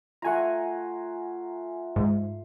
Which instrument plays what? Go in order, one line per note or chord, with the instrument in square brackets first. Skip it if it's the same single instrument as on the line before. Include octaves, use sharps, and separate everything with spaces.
[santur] A3 F4 [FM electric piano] F#5 G#5 A#5
[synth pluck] G#2